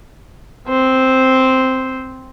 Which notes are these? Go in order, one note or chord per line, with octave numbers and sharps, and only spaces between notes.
C4 C5